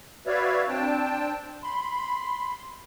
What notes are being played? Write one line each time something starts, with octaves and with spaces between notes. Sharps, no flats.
F#4 B4 C#5 D5 E5 F5
C4 D4 G5 A5
B5 C6